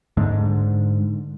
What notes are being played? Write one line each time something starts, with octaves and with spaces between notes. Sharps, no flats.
G#2 D3